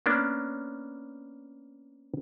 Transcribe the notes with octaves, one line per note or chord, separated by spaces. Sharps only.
A#3 B3 C#4 D4